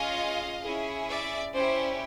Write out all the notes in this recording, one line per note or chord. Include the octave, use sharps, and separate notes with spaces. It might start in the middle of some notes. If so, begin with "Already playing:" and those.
Already playing: C#4 F4 G#4 D#5 F5
C#4 E4 G#4
D5 E5
C#4 E4 G4 C5 D5